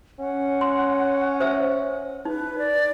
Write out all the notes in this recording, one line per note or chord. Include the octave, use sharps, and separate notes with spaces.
C#4 F#5
C6
C5 E5 E6
D#4 B4
D5